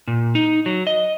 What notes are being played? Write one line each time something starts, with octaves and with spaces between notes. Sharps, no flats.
A#2
D#4
F#3
D#5